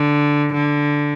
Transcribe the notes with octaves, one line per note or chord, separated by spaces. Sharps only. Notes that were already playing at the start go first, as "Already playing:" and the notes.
Already playing: D3
D3